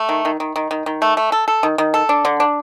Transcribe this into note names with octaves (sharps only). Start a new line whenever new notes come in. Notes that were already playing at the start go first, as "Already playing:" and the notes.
Already playing: A3
D#3
D#3
D#3
D#3
D#3
D#3
A3
A3
A4
A4
D#3
D#3
A4
D4
D3
D4